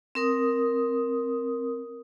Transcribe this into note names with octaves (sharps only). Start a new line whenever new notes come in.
C4 A#4 D#6